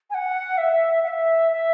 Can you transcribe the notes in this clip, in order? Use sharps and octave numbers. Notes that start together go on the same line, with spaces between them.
G#5
F#5
E5
F#5
E5
E5